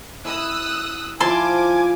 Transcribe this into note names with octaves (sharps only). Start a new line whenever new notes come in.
E4 D#6 E6 F#6
F3 E4 F4 C5 G#5 A5 C6 D6